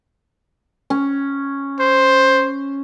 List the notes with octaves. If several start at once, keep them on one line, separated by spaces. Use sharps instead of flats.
C#4
C5